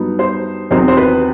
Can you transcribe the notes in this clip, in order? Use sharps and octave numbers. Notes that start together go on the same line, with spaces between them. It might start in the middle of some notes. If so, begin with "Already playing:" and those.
Already playing: G2 F#3 B3 D#4
C5
E2 D#3 F#3 C4 D#4 C5
C5
B4